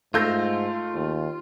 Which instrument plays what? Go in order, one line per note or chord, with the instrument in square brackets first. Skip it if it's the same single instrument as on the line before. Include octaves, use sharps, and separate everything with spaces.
[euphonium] G#2 [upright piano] A3 [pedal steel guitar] F4 [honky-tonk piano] E6 G6 A#6
[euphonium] D#2